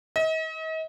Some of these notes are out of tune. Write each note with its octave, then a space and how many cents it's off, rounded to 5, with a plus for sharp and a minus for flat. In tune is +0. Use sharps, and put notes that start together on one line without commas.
D#5 +40